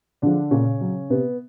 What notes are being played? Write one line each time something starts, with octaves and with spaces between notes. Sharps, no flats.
D3 F3 G#3 D4
A#2 C#3 C#4
F#3
C3 B3